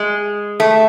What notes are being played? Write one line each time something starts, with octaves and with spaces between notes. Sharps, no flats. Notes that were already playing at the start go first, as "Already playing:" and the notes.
Already playing: G#3
A3